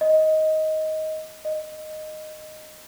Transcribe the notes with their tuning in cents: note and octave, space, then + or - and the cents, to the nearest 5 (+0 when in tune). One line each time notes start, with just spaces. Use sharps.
D#5 +10
D#5 -10